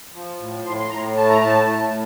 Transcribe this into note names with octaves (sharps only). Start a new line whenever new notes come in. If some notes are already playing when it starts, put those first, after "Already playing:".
F3
A2
A2 C6
C6
A2 A#5
A3 A5
A#5
A2 A5
A2